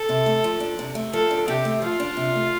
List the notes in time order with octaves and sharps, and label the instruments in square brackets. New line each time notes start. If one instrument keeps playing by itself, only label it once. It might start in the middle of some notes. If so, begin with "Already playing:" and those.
Already playing: [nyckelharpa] A4
[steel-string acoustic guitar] C3
A3
F3
D4
C3
A3
[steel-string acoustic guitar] F3 [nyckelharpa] A4
[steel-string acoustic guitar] D4
[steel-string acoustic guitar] C3 [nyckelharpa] G4
[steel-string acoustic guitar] A3
[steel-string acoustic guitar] F3 [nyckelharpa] F4
[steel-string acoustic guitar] D4
C3
A3